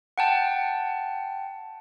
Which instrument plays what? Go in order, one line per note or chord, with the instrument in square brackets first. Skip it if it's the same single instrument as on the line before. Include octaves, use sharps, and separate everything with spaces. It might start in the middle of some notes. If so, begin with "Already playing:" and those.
[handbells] F#5 G5 A5